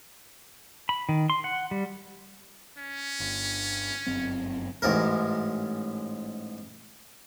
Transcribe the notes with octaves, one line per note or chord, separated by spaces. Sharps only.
B5
D#3
C6
F#5
G3
C#4
G1
G1 F#2 C4
A1 G#2 A#4